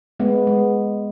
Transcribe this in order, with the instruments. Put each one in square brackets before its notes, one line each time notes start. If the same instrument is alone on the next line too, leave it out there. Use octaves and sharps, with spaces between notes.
[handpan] G#3 B3
G#3